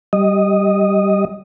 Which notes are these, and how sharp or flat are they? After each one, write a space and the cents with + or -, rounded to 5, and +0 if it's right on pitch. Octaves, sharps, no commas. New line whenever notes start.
G3 -10 D#5 +0